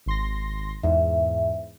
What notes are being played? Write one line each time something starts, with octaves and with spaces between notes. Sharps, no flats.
G#1 C6 A#6
E2 G#2 E5